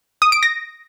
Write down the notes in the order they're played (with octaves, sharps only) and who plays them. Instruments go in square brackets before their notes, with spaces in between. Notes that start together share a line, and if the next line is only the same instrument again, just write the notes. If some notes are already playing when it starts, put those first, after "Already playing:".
[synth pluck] D#6
D7
A#6